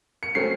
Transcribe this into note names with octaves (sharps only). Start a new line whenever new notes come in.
C#7
C#3 F#3 A3 C4 C7